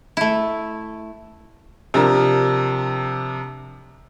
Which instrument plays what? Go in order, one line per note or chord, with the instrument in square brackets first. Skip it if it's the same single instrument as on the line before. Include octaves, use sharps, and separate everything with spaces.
[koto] A3 E4
[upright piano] C3 F3 D4 A#4